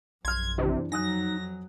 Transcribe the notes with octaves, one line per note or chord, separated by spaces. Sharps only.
A#1 F#2 C6 F6 G#6
C3 E3 D4
F2 F#3 D#4 G#5 D#6 F#6 A#6